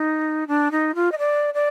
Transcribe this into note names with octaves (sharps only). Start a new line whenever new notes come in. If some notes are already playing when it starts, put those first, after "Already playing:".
Already playing: D#4
D4
D#4
F4
D#5
D5
D5